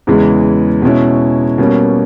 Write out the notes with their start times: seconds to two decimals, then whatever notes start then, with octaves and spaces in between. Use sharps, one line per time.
0.07 E2 C#3 E3 G#3
0.82 B2 G#3 C#4 E4
1.58 B2 G3 A#3 C#4